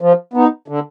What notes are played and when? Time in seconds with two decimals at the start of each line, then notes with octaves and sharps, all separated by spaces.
0.01 F3
0.33 B3 D#4
0.68 D3